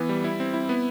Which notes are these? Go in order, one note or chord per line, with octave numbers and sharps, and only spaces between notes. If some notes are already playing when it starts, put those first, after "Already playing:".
Already playing: E3 B3
G3
E4
C4
E4
B3